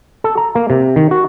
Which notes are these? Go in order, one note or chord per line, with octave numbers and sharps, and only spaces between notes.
A4
A#5
A#3
C3
D#3
F#4